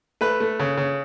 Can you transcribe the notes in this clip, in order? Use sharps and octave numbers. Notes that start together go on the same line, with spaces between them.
A3 B4
A3
C#3
C#3